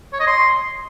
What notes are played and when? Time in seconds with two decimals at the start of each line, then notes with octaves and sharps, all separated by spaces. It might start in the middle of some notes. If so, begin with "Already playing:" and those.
0.13 C#5
0.20 D#5
0.27 C6